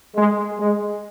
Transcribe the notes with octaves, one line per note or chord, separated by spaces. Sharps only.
G#3
G#3